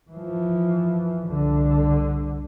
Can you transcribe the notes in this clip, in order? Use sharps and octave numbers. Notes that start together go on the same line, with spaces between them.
E3 F3
C2 D3